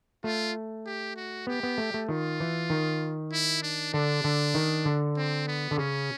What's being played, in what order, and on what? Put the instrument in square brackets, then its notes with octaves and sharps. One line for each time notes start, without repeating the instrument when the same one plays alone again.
[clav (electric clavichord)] A3 [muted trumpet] F4
[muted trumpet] G4
F#4
[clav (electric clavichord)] B3 [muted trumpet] G4
[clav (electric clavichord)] B3
A3
A3
[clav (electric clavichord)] D#3 [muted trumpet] F4
[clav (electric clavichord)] E3
D#3
[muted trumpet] E4
D4
[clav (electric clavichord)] D3 [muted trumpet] D4
[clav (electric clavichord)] D3
D#3
D3
[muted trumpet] C4
B3
[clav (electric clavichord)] D3
[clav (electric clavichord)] C#3 [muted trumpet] C#4